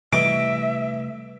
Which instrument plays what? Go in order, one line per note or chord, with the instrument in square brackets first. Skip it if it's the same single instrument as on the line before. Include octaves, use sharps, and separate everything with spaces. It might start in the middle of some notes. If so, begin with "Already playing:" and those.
[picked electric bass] C3 G3 A3 [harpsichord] E3 D#5 D6 [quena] E5 [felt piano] D7